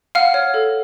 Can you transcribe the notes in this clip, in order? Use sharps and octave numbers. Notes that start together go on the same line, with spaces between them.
F5 F#5 F6
C#5
A4